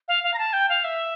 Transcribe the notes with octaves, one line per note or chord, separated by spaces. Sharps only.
F5
F5
A#5
A5
G5
F5
E5